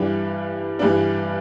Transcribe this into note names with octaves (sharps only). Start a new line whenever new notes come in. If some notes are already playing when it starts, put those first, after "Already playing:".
Already playing: G2 E3 G3 D4
G2 E3 G3 D4